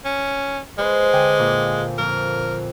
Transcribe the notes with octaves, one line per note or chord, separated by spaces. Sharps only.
C#4
G#3 B4 C5
D3 G5 G#5
A#2
F2 A#4